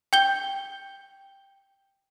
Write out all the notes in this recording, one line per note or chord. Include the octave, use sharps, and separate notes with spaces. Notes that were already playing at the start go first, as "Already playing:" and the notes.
G5 G6 G7